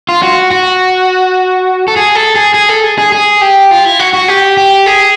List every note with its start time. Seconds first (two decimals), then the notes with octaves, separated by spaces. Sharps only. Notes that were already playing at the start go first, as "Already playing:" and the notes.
0.09 F4
0.23 F#4
0.51 F#4
1.88 A4
1.96 G#4
2.15 A4
2.36 G#4
2.54 G#4
2.69 A4
2.84 G#4
2.99 G#4
3.12 G#4
3.41 G4
3.71 F4
3.85 E4
3.99 F#4
4.13 F#4
4.28 G4
4.57 G4
4.86 G#4